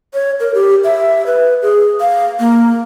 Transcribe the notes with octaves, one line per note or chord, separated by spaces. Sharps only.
C#5
A#4
G4
E5
B4
G#4
F5
A#3